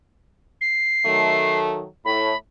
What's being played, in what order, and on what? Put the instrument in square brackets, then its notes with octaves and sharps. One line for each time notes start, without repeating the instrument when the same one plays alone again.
[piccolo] C7
[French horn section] D#3 F#3 A3
[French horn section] A2 [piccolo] B5